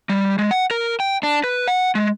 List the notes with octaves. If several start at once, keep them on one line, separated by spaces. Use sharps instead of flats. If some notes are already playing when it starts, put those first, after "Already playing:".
G3
G#3
F#5
A#4
G5
D4
B4
F#5
G#3